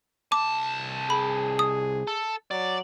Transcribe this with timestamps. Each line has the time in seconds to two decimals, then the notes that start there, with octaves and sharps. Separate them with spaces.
0.32 C2 A5 D6
1.10 G#4 B5
1.59 D#6
2.07 A4
2.51 F#3 D5